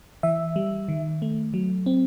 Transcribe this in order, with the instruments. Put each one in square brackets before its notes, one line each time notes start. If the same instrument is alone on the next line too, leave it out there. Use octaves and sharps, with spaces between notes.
[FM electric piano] E3 E5
G3
D#3
A3
F#3
C4